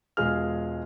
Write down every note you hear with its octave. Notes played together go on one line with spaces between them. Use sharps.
E1 G#3 F4 G#4 F6